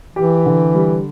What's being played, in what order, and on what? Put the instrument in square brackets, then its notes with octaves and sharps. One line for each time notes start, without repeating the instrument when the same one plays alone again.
[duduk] E3 [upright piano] G4
[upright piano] D3
G3